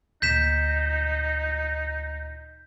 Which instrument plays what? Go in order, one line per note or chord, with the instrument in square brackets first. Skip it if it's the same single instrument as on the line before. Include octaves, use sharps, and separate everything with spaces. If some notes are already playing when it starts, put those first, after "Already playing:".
[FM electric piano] D2 A#2 [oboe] D#4 [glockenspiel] G6 B6 E7